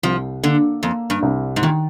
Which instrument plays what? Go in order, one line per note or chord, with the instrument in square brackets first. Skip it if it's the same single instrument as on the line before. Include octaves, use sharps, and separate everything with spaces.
[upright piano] C2 [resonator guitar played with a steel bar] F3
[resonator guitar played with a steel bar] D3 [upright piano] A#3
[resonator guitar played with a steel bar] F2 [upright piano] A#3
[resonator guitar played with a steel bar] G2
[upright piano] C2
[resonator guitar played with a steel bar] G#2
[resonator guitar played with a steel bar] A#2 [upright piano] D#3